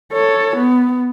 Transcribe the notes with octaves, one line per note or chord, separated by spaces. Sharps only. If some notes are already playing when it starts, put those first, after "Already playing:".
A4 C#5
B3